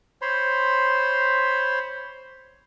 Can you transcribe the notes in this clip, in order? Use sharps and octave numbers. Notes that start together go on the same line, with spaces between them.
C5 C#5 B5 C6